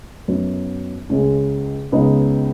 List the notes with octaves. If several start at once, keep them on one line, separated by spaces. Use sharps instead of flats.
F#2 F#3 B3 D#4
C#2 C#3 G#3 C#4
C#2 C#3 B3 D#4